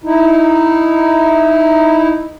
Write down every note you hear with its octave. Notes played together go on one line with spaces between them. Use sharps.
D#4 E4